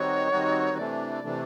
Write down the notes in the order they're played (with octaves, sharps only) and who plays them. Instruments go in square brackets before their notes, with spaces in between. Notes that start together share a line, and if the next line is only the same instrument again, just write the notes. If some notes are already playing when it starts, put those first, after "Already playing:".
Already playing: [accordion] D#3 G3 C4 D#4 F#4 [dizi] C#5
[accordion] D#3 G3 C4 D#4 F#4
[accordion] C3 E3 A3 D4 [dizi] D5
[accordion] C3 E3 A3 D4